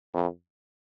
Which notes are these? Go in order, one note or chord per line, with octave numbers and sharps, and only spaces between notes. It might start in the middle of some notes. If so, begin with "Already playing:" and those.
F2